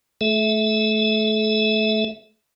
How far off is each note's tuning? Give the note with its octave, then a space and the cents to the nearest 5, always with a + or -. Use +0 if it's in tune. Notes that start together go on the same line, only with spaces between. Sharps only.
A3 -20 A4 -40 E5 -10